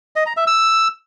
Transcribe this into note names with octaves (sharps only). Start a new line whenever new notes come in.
D#5
A#5
E5
E6